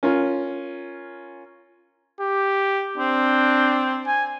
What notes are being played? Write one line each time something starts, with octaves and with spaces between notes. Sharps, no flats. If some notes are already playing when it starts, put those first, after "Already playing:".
C#4 F4 A#4
G4
C4 D4
G#5